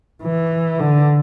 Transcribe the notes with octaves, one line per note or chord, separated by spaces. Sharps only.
E3
D3